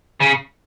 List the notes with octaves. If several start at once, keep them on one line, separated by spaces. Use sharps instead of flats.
C#3